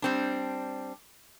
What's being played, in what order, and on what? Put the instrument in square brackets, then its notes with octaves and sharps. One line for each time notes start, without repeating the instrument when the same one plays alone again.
[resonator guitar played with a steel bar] G3 C4 D4